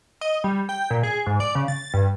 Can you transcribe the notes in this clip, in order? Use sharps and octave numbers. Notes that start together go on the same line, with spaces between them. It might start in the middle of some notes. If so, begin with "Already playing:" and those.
D#5
G3
G5
A#2
G#4
G#2
D5
C#3
A6
G2